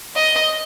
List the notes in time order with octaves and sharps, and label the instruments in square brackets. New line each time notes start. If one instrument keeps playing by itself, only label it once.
[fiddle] D#5